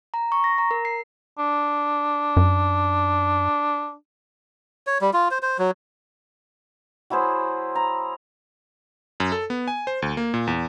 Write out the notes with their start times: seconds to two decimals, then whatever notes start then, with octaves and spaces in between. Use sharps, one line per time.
0.14 A#5
0.32 C#6
0.44 A#6
0.58 A#5
0.71 A#4
0.85 C7
1.39 D4
2.37 F#2
4.87 C#5
5.01 G3
5.13 F4
5.31 C5
5.43 C5
5.59 F#3
7.10 F#3 E4 G#4 C5
7.75 A#5
9.20 F#2
9.32 A4
9.50 B3
9.68 G#5
9.87 C5
10.02 D2
10.17 A#3
10.34 A#2
10.47 E2